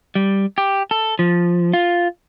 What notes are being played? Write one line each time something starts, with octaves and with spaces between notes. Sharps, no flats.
G3
G4
A4
F3
F4